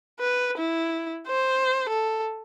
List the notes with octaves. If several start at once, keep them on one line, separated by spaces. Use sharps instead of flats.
B4
E4
C5
A4